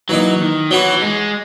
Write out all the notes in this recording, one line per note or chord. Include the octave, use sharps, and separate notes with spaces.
E3 F#3 A#3 D#4
D#3
E3 F#3 B3 F#4
G#3